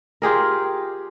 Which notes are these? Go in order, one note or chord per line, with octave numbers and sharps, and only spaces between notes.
F4 G4 G#4 A#4